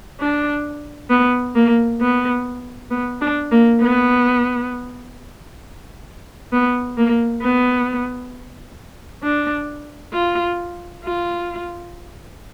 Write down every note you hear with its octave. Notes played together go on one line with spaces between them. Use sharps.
D4
B3
A#3
B3
B3
D4
A#3
B3
B3
A#3
B3
D4
F4
F4